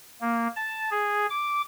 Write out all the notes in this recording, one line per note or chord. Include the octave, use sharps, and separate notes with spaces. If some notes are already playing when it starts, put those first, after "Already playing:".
A#3
A5
G#4
D6